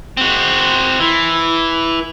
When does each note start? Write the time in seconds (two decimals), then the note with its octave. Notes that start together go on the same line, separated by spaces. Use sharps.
0.17 C4 F#4
1.00 E3